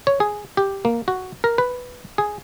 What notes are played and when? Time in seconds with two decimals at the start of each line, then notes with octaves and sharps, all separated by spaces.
0.07 C#5
0.20 G#4
0.57 G4
0.85 A#3
1.08 F#4
1.44 A#4
1.58 B4
2.18 G#4